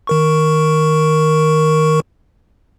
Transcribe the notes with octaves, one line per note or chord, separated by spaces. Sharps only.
D#3 A#4 C#6